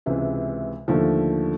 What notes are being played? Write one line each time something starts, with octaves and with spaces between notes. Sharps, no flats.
C#2 C3 E3 G#3
D#2 D3 F3 A3